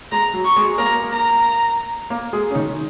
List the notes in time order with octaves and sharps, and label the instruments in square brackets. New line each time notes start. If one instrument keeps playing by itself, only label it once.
[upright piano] G#3 [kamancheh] A#5
[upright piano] F#3 F#4
[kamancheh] C#6
[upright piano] G#3 G#4
[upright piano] A#3 A#4 [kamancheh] A#5
[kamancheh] A#5
[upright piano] A#3 A#4
G#3 G#4
C#4
D#3 D#4